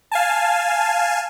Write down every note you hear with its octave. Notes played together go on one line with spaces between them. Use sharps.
F5 G#5 A5